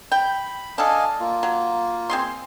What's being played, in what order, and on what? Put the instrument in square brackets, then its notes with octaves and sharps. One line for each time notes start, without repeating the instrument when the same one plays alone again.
[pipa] G5 [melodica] B5
[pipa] D4 A4 [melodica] D#5 F5 G#5
[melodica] A#3 F4
[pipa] F#3
C4 G#4 C6